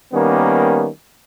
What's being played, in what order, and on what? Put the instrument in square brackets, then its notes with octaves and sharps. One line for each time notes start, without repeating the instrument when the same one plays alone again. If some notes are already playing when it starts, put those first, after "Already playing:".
[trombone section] D#3 G3 A#3 B3 C#4